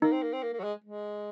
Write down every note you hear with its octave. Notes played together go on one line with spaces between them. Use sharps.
A#3 D#4
C4
A#3
C4
A#3
A#3
F#3
G#3
G#3